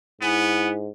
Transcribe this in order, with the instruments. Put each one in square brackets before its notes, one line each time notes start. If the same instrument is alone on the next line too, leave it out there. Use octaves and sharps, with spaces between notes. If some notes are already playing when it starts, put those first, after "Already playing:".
[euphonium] G#2 [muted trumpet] B3 [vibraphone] E4 G#5